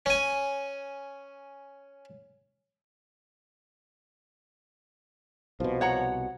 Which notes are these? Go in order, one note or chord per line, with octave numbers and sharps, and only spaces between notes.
C#4 G#5
C2 B2 F3
C#5 F#5 A#5